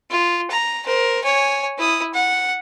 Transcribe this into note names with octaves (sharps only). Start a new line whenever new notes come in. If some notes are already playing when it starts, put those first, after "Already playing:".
F4
A#5
A#4 C5
C#5 G#5
E4 D#6
F#5